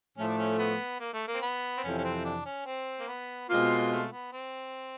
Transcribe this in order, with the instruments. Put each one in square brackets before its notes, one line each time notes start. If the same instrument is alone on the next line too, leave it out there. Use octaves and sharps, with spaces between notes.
[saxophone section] A2 F3 A3 [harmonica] C#4
[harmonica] D4
C#4
B3
A#3
A3
A#3
C4
B3
C4
[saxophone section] F2 C3 E3 [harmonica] C#4
[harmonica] C#4
C4
D4
C#4
C4
A#3
B3
[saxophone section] B2 G#3 C4 F4 [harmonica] A#3
[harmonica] A#3
A3
B3
C4